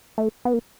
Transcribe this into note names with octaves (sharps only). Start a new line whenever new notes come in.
A3
B3
A#3